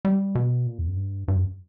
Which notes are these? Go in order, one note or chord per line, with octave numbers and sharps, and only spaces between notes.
G3
B2
A#2
E2
F#2
G2
G2
F#2